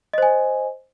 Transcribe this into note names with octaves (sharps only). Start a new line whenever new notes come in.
C5 D#5 G#5